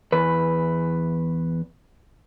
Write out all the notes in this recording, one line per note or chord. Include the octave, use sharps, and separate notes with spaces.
E2 B4